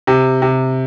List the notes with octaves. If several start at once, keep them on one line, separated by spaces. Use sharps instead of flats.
C3
C3